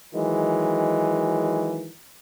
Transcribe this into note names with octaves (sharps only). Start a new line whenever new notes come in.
D#3 E3 F#3 G#3